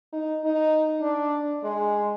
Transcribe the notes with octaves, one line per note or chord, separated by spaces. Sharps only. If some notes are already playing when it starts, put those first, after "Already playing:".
D#4
D#4
D4
G#3